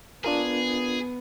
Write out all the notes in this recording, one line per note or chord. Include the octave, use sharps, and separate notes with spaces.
B3 D4 F4 G#4 A#4